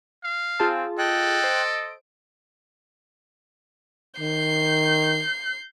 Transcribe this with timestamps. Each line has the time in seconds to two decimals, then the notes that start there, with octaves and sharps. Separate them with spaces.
0.24 F5
0.60 C4 F4 G#4 A5
0.98 A4 D#5 G5 F#6
1.44 C5 D7
4.20 D#3 G6 C7